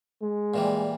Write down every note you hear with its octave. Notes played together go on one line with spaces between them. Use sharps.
G#3
A#2 E3 G3